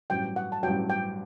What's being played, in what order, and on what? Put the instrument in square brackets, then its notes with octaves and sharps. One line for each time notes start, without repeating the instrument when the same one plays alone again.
[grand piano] A1 G2 F#3 [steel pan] G5
[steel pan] F#5
A5
[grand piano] A1 G2 F#3 [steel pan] G5
[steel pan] G5